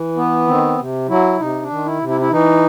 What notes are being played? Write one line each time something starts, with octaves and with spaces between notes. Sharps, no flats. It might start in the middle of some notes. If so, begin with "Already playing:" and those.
Already playing: E3
B3
D#3 C4
C3
F#3 E4
C3 D#4
D4
D#3
E4
C3
E4
E4
E3 D#4